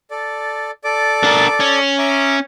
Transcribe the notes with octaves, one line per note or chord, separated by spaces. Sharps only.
A4 D5
A4 D5 D6
D4 A#4
C#4
E5 A#5 D6